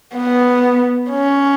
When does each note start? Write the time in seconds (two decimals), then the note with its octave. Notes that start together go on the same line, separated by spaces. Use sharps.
0.15 B3
1.10 C#4